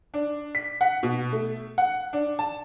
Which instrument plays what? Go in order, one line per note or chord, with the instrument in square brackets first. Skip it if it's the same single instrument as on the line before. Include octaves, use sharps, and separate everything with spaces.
[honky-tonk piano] D4
B6
F#5
B2
A3
F#5
D4
A5